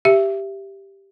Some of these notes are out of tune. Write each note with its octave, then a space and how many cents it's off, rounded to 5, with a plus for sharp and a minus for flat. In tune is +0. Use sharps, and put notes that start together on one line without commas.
G4 +0 E5 +20